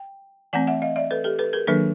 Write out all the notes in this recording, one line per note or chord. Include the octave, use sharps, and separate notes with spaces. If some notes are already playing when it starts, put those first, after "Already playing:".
Already playing: G5
E3 A3 C4 F#5 G#5
E5 F#5
D#5 F5
D5 E5
A4 B4
G4 A4
A4 B4
G#4 A#4
D#3 F#3 A#3 D4 A4 B4